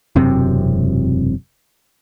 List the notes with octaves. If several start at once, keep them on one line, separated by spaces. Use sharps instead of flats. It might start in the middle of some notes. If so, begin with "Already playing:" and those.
E1 F#2 C3 C4